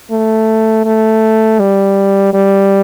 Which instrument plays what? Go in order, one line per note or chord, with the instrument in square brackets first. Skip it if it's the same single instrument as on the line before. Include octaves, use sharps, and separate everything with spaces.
[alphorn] A3
A3
G3
G3